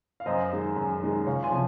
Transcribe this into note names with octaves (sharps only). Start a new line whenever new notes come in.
F5
F#2 C5 D#5
D#3 G#3
F#2
D#3 G#3
C#2 C#5 F5
G#5 C6
C3 F3